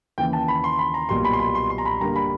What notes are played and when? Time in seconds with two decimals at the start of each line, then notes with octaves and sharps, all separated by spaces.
0.18 D#2 C#3 E3 G5
0.33 A5
0.48 B5
0.64 C6
0.79 B5
0.94 A#5
1.09 B1 A#2 G3 A#3 C6
1.25 B5
1.33 C6
1.40 B5
1.55 C6
1.70 C6
1.78 A#5
1.85 B5
2.00 G2 D3 G3 A#3 A#5
2.16 B5